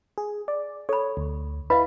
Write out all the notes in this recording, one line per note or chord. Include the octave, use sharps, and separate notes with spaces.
G#4
D5
A4 C#5 B5
D2
E4 B4 D#5 F5 B5